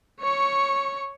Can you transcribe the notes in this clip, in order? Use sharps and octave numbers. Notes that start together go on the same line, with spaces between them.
C#5 C#6